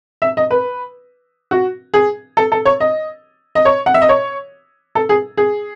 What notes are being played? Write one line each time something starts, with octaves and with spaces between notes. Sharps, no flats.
E5
D#5
B4
F#4
G#4
A4
A4
C#5
D#5
D#5
C#5
F#5
E5
D#5
C#5
A4
G#4
G#4